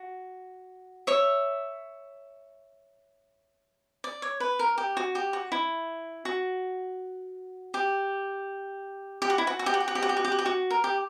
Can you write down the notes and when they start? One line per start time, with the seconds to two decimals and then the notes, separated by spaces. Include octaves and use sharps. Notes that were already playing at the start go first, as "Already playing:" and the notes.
Already playing: F#4
1.07 C#5 E5
4.04 D5
4.22 C#5
4.40 B4
4.59 A#4
4.78 G4
4.97 F#4
5.15 G4
5.33 F#4
5.52 E4
6.25 F#4
7.74 G4
9.22 G4
9.30 F#4
9.38 E4
9.47 F#4
9.59 F#4
9.66 G4
9.74 F#4
9.80 G4
9.88 F#4
9.95 G4
10.02 F#4
10.09 G4
10.17 F#4
10.25 G4
10.32 F#4
10.39 G4
10.46 F#4
10.71 A#4
10.84 G4